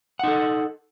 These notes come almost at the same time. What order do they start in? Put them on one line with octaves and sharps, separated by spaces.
F#5 D#4 A4